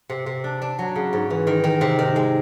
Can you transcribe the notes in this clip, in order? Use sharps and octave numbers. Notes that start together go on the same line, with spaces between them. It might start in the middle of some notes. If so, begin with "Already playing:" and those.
C3
C3
D4
D4
F#3
C#3
G#2
E3
D#3
D#3
C3
D#3
G#3